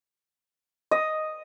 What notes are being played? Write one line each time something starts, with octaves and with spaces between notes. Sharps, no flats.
D#5